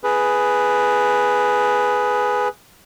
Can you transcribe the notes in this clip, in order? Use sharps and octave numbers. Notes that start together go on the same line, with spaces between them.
G#4 B4